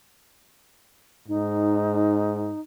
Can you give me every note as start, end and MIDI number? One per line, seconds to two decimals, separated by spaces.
1.28 2.52 44
1.28 2.60 63